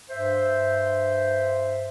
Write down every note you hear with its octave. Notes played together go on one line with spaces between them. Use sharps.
G2 C5 E5